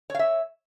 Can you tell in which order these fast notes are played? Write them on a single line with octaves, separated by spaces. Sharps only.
C#5 F5 E5